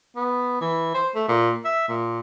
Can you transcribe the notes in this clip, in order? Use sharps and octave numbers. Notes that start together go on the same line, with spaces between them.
B3
E3
C5
A3
A#2
E5
A#2